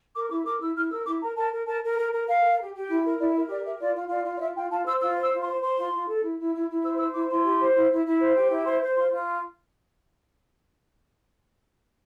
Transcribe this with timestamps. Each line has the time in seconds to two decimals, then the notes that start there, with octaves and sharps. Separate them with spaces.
0.15 A#4 D6
0.30 E4 D6
0.45 A#4 D6
0.60 E4 E6
0.75 E4 F6
0.91 A#4 E6
1.06 E4 D6
1.21 A#4 A#5
1.36 A#4 A5
1.51 A#4
1.66 A#4 A5
1.82 A#4
1.97 A#4
2.13 A#4
2.27 A#4 F5
2.43 A#4
2.58 G4
2.73 G4
2.88 E4
3.04 A#4
3.19 E4 D5
3.33 A#4 E5
3.49 G4 D5
3.64 A#4 E5
3.79 F4 D5
3.95 F4
4.09 F4 D5
4.25 F4
4.36 D5
4.40 F4 E5
4.55 F4 G5
4.70 F4 A5
4.86 C5 E6
5.01 F4 E6
5.17 C5 E6
5.32 F4
5.41 C6
5.46 C5
5.61 C5 C6
5.77 F4
5.92 F4
6.07 A4
6.23 E4
6.38 E4
6.53 E4
6.68 E4
6.82 C5 E6
6.98 C5 E6
7.13 E4 D6
7.28 E4 C6
7.43 G4
7.60 C5
7.74 E4
7.90 E4
8.04 E4
8.20 C5
8.35 G4
8.50 E4
8.65 C5 C6
8.81 C5
8.96 F4 C6
9.10 F4